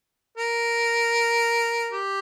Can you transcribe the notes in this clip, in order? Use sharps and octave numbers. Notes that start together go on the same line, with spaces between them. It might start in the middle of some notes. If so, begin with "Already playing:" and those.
A#4
G4